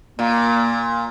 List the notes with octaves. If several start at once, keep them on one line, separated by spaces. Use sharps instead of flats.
A#2 A#3